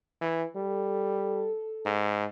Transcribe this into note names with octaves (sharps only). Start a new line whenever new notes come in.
E3
G3 A4
G#2